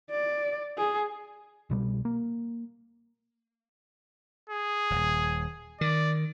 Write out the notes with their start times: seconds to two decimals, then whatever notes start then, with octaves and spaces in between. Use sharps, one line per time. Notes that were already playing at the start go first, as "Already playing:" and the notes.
0.11 D5
0.77 G#4
1.70 C2 B2 G3
2.05 A#3
4.50 G#4
4.90 D#1
5.81 D#3 D5